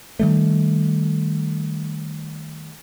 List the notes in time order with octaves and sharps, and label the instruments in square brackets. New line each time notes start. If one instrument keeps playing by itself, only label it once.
[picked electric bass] D#3 G3 A3